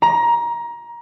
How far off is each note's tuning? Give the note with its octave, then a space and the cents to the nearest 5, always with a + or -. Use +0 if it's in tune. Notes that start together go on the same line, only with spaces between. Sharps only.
A#5 +20